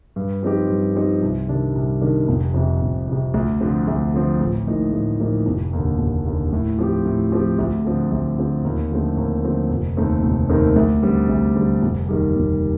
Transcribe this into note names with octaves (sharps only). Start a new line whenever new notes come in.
G2
F3 C4 D#4 G4
G2
F3 C4 D#4 G4
C2
C3 D#3 G3 D4
C2
C3 D#3 G3 D4
F1
F2 C3
F1
F2 C3
D2
D3 F3 C4
D2
D3 F3 C4
A1
A2 F3 A#3 D#4
A1
A2 F3 A#3 D#4
F1
D#2 D3
F1
D#2 D3
A2
F3 C4 G4
A2
F3 C4 G4
D2
D3 F3 C4
D2
D3 F3 C4
D#2
D3 F3 A3 C4
D#2
D3 F3 A3 C4
F1
D#2 D#3 A3 C4
F1
D#2 D#3 A3 C4
D2
D3 G3 C4
D2
D3 G3 C4
F1
D#2 D#3 G3
F1